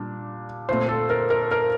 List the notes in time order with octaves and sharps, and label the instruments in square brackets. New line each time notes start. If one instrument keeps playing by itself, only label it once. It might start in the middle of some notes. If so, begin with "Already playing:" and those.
Already playing: [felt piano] A#2 G3 D4
A#2 A3 C4 C5
A4
A#4
A#4
A#4